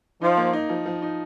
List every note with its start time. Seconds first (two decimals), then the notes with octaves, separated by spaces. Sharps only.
0.22 F3 D#4
0.37 A#3
0.53 D#4
0.69 F3
0.86 F3
1.02 D#4